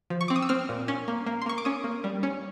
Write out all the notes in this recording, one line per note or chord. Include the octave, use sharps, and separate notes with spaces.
F3
C#6
C4 D6
D#6
E6
C4 F6
A#2
C#4
A#3
A#3
C6
A#3 C#6
D6
C#4 D#6
A#3
G3
C#4